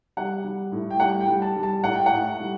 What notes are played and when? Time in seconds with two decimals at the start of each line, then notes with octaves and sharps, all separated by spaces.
0.17 G3 F#5
0.44 G3
0.72 A2
0.91 G5
1.00 G3 F#5
1.21 G5
1.28 G3
1.42 A5
1.56 G3
1.63 A5
1.83 A2 F#5
1.95 G5
2.06 F#5
2.12 A2
2.40 G3